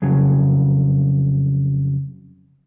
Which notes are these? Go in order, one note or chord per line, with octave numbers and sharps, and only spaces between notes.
F2 C#3 F#3